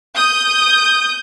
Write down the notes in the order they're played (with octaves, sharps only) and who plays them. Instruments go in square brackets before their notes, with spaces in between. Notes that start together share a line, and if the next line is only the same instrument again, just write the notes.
[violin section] D#6 G6